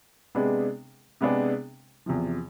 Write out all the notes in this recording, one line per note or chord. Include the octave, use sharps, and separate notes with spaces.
C3 G#3 B3 D4 G#4
C3 G#3 B3 D4 G#4
E2 C3 F3